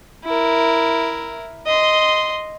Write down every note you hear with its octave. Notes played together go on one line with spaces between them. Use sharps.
E4 A#4
D#5 C6